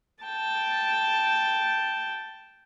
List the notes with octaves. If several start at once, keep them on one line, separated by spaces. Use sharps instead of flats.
G5 A5